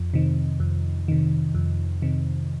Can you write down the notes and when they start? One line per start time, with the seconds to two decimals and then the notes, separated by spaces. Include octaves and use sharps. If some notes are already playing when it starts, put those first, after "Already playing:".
Already playing: F2
0.14 C3 D#3
0.60 F2
1.08 C3 D#3
1.54 F2
2.02 C3 D#3